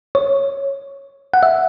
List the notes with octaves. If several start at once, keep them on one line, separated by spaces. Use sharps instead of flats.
C#5
F#5
E5